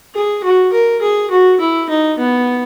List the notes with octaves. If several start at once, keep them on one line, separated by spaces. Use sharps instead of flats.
G#4
F#4
A#4
G#4
F#4
E4
D#4
B3